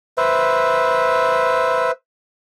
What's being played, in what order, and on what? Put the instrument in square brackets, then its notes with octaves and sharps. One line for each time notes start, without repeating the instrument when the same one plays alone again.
[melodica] B4 C5 E5